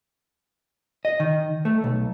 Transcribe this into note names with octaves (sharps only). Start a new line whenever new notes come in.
D#5
D#3
A3
B1